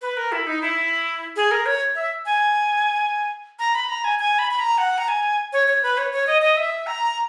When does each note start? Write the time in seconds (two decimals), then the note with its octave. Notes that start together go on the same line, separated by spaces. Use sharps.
0.02 B4
0.17 A#4
0.32 E4
0.47 D#4
0.61 E4
1.36 G#4
1.51 A#4
1.66 C#5
1.95 E5
2.26 G#5
3.59 A#5
3.75 B5
3.89 A#5
4.04 G#5
4.19 G#5
4.39 B5
4.51 B5
4.59 A#5
4.78 F#5
4.98 A#5
5.08 G#5
5.53 C#5
5.67 C#5
5.83 B4
5.97 C#5
6.13 C#5
6.27 D#5
6.42 D#5
6.57 E5
6.87 A#5